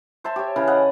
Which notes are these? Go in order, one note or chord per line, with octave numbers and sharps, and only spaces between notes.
C5 E5 A5 C6
G4 C#5
C#3 E3 F5
D#5 F#5